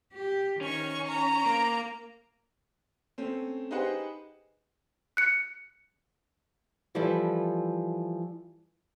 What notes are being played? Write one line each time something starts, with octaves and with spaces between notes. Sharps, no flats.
G4
D#3 C#4 C#6
A#5
A#3
A3 C4 C#4
D#4 G4 G#4 B4 C5 F#5
F#6 C#7
E3 F3 G3 E4 G4 A4